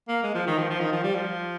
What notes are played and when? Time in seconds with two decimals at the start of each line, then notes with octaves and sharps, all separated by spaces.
0.09 A#3
0.23 G#3
0.35 F3
0.47 D#3
0.58 F3
0.70 F3
0.80 D#3
0.92 F3
1.03 G3
1.15 F3